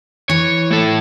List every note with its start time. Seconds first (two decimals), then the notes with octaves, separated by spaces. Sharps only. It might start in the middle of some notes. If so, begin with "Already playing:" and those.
0.29 E3 C#5
0.71 A2 A4